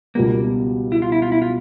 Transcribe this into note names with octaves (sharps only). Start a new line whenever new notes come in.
C#2 B2 G3 A#3 B3
E4
F4
E4
F4
E4
F4